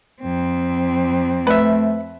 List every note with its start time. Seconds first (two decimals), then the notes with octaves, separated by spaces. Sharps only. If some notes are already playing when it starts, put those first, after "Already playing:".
0.21 F2 C4
1.47 A3 B4 E5